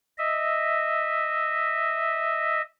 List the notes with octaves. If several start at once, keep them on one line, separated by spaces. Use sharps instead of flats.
D#5 E5